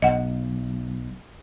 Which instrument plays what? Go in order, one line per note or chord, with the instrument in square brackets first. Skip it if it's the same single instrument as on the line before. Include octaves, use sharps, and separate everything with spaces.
[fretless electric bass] B1 [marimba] D#5 F#5